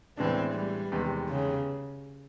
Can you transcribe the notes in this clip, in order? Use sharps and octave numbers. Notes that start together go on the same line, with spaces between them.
A2 E3 G#3 B3 C4 D4
G3
E2 C3 D#3 G#3 B3
C#3